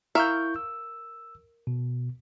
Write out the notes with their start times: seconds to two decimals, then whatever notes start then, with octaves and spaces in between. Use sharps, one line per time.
0.15 E4 A#4 E5 F5 C#6 G6
0.56 E6
1.67 B2